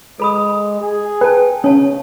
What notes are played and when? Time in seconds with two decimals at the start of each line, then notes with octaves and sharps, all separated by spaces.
0.20 G#3 A4 B5 D#6
0.80 G#4
1.21 B4 G5 A5
1.64 C#3 C#4 C#5 A5